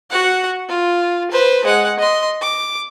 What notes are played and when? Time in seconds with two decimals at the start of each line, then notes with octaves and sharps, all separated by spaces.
0.11 F#4 F#5
0.69 F4
1.31 B4 C5
1.65 G#3 F#5
2.00 D#5 C6
2.41 D6